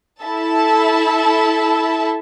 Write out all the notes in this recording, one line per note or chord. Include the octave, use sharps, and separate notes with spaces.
E4 A4 E5 A5